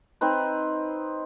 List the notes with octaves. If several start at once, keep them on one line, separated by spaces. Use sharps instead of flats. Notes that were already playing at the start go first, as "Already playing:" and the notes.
C4 D#4 B4